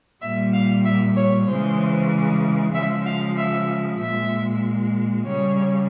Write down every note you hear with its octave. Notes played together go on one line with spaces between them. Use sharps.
A#2 G3 E5
F5
E5
C#5
C#3 E3 G#3 C5
C#3 F3 G#3 E5
F5
E5
A#2 G#3 E5
C#3 G3 C#5